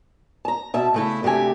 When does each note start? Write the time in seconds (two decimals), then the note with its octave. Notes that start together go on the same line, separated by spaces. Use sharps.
0.45 A5 A#5
0.74 B2 E5 A5
0.94 C#3 A3 E4
1.23 D2 C3 A3 G4 G#5